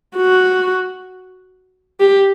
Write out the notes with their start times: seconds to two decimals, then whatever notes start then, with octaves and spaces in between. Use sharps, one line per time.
0.17 F#4
2.00 G4